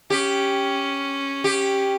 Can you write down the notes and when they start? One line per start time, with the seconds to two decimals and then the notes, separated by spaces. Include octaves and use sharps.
0.10 C#4 G4
1.44 G4